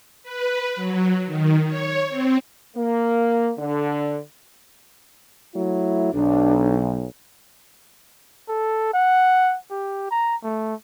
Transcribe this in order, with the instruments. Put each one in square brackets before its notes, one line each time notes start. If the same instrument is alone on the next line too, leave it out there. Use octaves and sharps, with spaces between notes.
[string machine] B4
F#3
D#3
C#5
C4
[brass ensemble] A#3
D3
[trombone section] F#3 A3 E4
[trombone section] B1 [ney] D4
[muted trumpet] A4
F#5
G4
A#5
A3